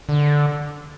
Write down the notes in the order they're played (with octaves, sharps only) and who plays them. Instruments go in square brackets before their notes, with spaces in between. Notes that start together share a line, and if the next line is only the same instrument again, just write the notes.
[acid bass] D3